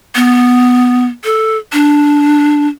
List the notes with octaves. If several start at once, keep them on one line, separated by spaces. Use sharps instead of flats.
B3
A4
D4